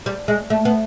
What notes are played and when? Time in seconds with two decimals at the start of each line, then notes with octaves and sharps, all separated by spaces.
0.06 G3
0.28 G#3
0.50 A3
0.65 B3